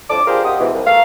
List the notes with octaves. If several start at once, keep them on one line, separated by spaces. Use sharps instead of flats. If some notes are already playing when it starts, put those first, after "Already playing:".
F2 A2 D3 A5 D6
D4 F4 G4 G#4 A#4 C5
F#2 D#4 G4 F5 F#5 D#6
G#2 B2 E3
C2
A3 A#4 F5